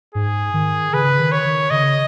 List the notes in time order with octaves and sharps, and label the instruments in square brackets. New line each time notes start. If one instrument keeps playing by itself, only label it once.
[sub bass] G#2 [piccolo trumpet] G#4
[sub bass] D#3
[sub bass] C#3 [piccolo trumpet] B4
[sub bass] D#3
[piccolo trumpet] C#5
[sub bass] D#3
[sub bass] C#3 [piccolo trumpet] D#5